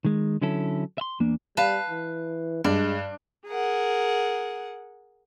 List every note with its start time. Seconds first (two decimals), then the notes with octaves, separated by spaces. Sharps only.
0.05 D#3 G#3
0.42 D3 F#3 C#4 E4 A4
0.98 E5 C6
1.20 E2 A#3 D4
1.57 G3 B4 F5 A5
1.90 E3
2.64 G2 G#3 D4
3.47 G#4 A#4 F#5